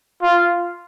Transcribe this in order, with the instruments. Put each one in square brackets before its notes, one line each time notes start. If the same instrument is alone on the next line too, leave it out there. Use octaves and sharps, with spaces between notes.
[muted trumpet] F4